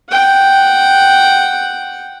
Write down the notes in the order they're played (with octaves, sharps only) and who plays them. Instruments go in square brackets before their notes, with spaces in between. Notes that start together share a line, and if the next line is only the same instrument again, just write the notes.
[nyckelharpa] F#5 G5